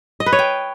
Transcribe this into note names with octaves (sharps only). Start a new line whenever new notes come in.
D#5
B4
C#5
G5